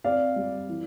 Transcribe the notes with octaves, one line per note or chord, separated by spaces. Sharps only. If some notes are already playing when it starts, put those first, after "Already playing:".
C4 D5 F5
G3
E3